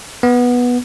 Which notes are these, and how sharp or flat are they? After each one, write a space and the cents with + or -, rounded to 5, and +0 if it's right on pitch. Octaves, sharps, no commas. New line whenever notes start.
B3 -10